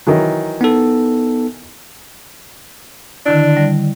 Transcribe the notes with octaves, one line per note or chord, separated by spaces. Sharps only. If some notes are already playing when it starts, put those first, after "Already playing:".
D#3 E3 F#3
B3 D#4 A4
D3 D#3 D4 E4
G3